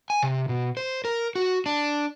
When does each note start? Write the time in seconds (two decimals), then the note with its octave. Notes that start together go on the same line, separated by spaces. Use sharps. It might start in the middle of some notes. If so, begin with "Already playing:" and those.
0.10 G#5
0.23 C3
0.49 B2
0.77 C5
1.05 A#4
1.35 F#4
1.66 D4